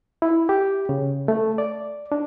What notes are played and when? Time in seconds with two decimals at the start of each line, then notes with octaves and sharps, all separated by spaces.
0.22 E4
0.49 G4
0.89 C#3
1.28 A3
1.58 D5
2.12 D4